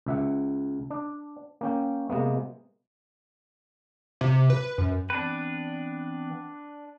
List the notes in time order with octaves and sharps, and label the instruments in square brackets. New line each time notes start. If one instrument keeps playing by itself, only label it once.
[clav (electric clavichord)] C#2 E5 F#5
D4
A#3 C#4 G5
C3 G#3 A#3 B3
[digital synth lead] C3
B4
F#2
[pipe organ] E3 B3 C4 [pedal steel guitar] D4 B4